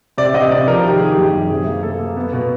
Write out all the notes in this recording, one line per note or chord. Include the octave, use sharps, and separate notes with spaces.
C3 D5
C3 D#5
C3 D5
F3 A#4
D#3 G4
D#3 G#4
G4
F#2
F#2
C3 G#4
A#3
A#3 A4
A#3
B3
B2